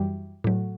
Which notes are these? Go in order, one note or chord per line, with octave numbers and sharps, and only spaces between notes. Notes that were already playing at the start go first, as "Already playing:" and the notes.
Already playing: F#2 E3 G3
A2 F#3